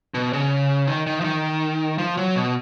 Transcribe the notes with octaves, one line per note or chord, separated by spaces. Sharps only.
B2
C#3
D#3
D#3
F3
D#3
F3
F#3
B2